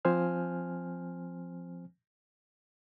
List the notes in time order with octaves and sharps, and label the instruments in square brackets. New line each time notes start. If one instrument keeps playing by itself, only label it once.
[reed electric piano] F3 C4 C5 G#5 F6